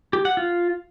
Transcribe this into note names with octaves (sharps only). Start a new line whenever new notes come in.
G4
F#5
F4